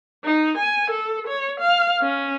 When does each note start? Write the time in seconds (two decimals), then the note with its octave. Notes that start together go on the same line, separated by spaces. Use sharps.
0.24 D#4
0.58 G#5
0.91 A4
1.27 C#5
1.60 F5
2.02 C#4